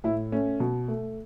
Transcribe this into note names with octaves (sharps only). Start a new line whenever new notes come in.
A2 E4
A3 C#4
B2
A3